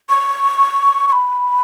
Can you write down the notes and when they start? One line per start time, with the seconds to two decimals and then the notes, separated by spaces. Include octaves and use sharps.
0.10 C#6
1.09 C#6
1.12 B5